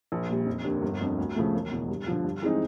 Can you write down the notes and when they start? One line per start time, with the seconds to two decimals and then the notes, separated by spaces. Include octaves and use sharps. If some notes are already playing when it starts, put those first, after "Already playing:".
0.12 A#1
0.29 A#2 G3
0.46 F1
0.64 D#2 D3
0.82 G1
1.01 F2 D3
1.18 D2
1.36 C#3 F3 A3
1.53 E1
1.71 E2 B2
1.88 G2
2.07 D3 F3
2.24 G2
2.42 E3 G#3 C4 D#4